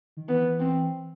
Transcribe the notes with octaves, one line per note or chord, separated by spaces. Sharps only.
D#3
E3 B3
C4